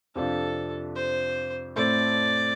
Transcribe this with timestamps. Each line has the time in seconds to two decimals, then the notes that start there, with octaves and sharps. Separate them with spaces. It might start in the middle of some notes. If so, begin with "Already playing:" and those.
0.15 F2 C3 F3 D4 F4 A4
0.96 C5
1.76 A2 A3 C4 A4 C5 D5